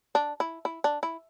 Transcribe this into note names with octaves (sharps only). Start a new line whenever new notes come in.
D4
E4
E4
D4
E4